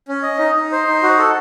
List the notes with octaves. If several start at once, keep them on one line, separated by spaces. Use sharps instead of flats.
C#4
D#5
D#4
D#4
C5
D#4
F#4
A4